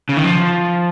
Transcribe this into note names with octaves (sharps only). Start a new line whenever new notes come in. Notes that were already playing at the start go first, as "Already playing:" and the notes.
C#3
D#3
F3